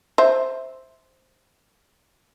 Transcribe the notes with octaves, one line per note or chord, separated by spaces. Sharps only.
C5 E5